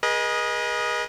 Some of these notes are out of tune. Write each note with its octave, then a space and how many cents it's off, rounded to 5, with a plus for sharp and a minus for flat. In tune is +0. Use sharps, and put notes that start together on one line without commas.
G#4 -5 B4 -45 D#5 +0